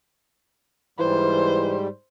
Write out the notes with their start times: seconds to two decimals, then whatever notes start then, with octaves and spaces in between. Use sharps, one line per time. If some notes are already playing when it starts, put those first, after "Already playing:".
0.99 G#2 E3 G3 C5